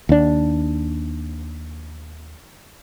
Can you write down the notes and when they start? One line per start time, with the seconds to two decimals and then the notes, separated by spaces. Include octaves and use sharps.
0.09 D#2 D4